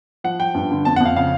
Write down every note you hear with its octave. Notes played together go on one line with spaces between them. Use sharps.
F3 F#5
F3 G5
G2
D3
F2 A5
F#5
F2
F5
C#3 F5